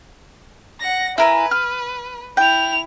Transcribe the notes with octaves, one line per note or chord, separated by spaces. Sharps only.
F#5 A#6
E4 A#4 B4 G#5
F6
E4 G5 F7